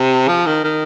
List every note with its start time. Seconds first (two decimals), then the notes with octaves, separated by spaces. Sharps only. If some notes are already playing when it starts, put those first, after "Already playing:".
Already playing: C3
0.28 F3
0.46 D#3
0.64 D#3